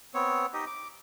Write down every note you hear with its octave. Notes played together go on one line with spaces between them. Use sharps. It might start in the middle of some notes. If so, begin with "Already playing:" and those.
B3 C4 C#5
D#4 G4 D#5
D6